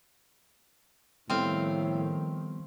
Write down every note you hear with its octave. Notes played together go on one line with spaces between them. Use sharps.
A2 D#3 F3 G3 B3 C4 F5